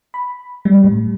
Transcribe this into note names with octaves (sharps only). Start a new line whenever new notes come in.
B5
G3
A2